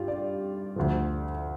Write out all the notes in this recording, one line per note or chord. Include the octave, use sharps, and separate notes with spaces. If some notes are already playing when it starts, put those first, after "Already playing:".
Already playing: G2 F4 G4
D5
D2 D3 F3